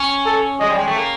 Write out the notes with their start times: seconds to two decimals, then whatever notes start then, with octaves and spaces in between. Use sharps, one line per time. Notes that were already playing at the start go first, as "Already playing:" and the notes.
Already playing: C#4
0.26 A4
0.60 G#3 D#5
0.70 G3
0.79 G#3
0.88 A3
0.96 A#3